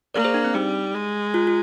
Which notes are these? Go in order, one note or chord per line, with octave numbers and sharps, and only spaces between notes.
A#3 A#4 D5
G#4 C5
D4
C4
G3 D#4
G#3
F4
F4